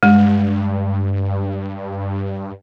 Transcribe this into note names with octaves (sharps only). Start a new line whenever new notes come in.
G2 G#3